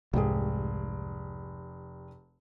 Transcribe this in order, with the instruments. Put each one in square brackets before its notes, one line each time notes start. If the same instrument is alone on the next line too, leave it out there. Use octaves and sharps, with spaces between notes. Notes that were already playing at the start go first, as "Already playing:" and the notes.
[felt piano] F1 G4 G#4 [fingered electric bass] C2 G#2